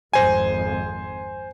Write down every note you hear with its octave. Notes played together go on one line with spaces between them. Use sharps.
G#1 F2 C5 G#5